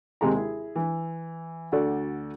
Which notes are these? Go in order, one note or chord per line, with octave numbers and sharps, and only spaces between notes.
D#2 C3 G#3 G#4 A#5
E4 G#4
E3
D2 F#4 A4 D5